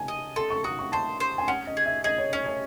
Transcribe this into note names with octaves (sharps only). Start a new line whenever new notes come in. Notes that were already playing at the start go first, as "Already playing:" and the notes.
Already playing: G#5 A5
D#5
A4 C6
C#6
F#4 D#6
C#6
C5 A5
C5
G#5
C#4 F#5
D#5
G#4
E5
G#4 D#5
C#5
C#4 C#5
C#5